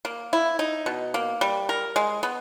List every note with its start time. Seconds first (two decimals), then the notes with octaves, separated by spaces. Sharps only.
0.05 A#3
0.33 E4
0.59 D#4
0.86 B2
1.14 A#3
1.41 G3
1.69 A#4
1.96 G#3
2.23 B3